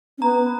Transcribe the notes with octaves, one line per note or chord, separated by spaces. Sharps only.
C#4
B3 A#5